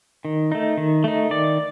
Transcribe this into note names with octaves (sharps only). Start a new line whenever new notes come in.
D#3
A3 D#4
D#3
A3 D#4
D#3 D5